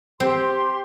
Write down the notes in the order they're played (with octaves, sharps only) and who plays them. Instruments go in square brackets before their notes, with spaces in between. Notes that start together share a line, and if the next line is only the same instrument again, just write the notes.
[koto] C4 [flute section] G4 C6